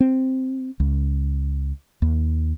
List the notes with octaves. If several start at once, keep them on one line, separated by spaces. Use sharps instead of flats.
C4
C#2
D#2